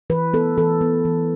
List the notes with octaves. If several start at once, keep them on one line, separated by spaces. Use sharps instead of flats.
E3 B4
B3 A4
E3 A4
B3
E3